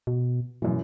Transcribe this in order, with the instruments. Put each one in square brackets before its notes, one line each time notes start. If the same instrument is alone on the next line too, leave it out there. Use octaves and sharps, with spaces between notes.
[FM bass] B2
[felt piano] F#2 E3 [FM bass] B2